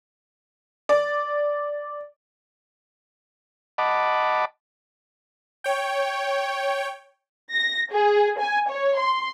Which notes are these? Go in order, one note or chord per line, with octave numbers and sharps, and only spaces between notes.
D5
D#5 F#5 A5 B5 D6
C#5 G5
A#6
G#4
G#5
C#5
C6